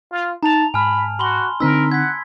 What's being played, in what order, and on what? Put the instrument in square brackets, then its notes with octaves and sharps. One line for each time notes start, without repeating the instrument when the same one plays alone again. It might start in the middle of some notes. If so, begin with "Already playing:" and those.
[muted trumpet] F4
[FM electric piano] D#4 [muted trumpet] A5 [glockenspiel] A#5 F7
[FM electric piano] G#2 [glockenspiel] G#5 A5 F6 [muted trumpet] B5
[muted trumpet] F#4 [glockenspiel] B5 C6 G7
[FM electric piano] D3 C4 D#4 [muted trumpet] A#4 [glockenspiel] E6 B6
[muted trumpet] F#5 [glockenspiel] G#6 B6